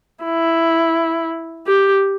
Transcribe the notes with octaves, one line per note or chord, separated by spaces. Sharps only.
E4
G4